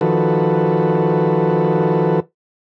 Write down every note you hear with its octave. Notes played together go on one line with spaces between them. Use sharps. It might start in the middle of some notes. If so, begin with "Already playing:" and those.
D#3 F3 F#4 A4 B4